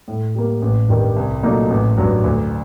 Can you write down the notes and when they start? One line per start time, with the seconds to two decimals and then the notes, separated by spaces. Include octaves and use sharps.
0.08 A2
0.35 G3 A#3
0.62 A1
0.89 G2 D#3 G3
1.16 C2
1.43 A#2 F#3 A3 D#4
1.70 A1
1.98 G2 F#3
2.24 D2